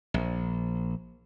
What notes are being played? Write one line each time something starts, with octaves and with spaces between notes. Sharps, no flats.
A#1